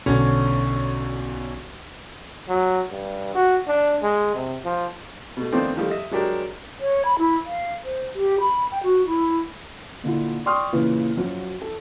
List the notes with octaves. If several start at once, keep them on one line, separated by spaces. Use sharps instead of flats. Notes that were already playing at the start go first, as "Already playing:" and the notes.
B1 D3 C#4
F#3
G2
F#4
D4
G#3
C3
F3
B2 A3
D#3 F3 A3 B3 C4 D4
D#3 F3 G3 A3
D#5 E5
F#3 G#3 D4 G4 A#4
C#5
B5
E4
F5
C5
G4
B5
G5
F#4
E4
A#2 D3 E4 F4
D5 G5 C6 C#6 D#6 F6
A#2 C#3 E3 F4
F#2 F3 F#3
A4